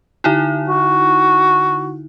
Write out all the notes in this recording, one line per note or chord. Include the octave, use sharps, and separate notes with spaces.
D3 D#4 E4
F#4